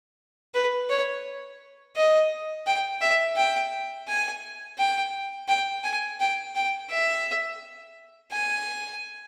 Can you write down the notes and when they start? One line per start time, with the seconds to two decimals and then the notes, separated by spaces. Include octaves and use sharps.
0.54 B4
0.90 C#5
1.96 D#5
2.66 G5
3.01 E5
3.37 G5
4.08 G#5
4.78 G5
5.48 G5
5.84 G#5
6.20 G5
6.55 G5
6.90 E5
8.31 G#5